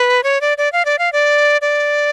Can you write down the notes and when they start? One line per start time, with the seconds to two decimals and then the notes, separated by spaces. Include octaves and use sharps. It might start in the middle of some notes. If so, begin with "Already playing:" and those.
Already playing: B4
0.23 C#5
0.41 D5
0.58 D5
0.72 F5
0.85 D5
0.99 F5
1.13 D5
1.61 D5